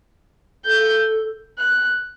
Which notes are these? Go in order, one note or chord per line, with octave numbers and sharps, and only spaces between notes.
A4 G6
F#6